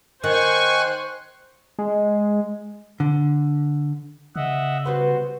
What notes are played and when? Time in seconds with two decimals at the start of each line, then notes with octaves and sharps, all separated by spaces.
0.24 D#3 C5 G#5 C#6 F#6
1.78 G#3
3.00 D3
4.36 C#3 D#5 E5 F#5
4.86 G3 B3 F#4 B4 C5